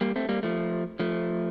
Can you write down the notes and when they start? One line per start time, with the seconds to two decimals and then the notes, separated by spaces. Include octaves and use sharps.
0.01 G3 A#3
0.16 A3 C4
0.29 G3 A#3
0.43 F3 A3
0.99 F3 A3